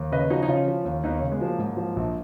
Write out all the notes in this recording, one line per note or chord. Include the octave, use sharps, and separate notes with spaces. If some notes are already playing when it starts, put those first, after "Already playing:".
Already playing: D#2
C#3 B4 D#5
F3 D#4 F#4
D#4
C#3 C#4 F4
F3
D#2
D#2 B3 D#4
C#3 A#3 C#4
G#3 B3
F3 F#3 A#3
G#2
F3
A#1